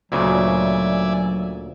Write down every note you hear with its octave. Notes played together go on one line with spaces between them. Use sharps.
D2 A#2 C#3 F#3 D5 E5 G#5